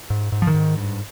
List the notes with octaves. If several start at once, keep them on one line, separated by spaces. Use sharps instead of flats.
G#2
G#2
F3
D#3
G#2
G2